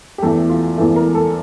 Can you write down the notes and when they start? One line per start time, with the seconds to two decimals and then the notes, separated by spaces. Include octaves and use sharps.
0.18 G4
0.22 E2 E3 A3 A4
0.50 F4
0.77 E2 E3 A3
0.96 A#4
1.15 A4